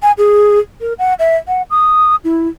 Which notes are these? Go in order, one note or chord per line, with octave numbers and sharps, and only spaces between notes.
G#5
G#4
A#4
F#5
E5
F#5
D#6
E4